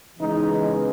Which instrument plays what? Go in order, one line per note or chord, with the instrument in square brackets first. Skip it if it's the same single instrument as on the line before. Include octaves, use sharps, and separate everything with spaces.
[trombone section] C#3 E3 G#3 B3 D#4